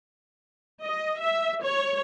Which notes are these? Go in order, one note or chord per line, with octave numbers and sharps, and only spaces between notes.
D#5
E5
C#5